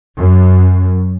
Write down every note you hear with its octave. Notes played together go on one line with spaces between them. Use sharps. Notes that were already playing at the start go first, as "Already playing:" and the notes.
F#2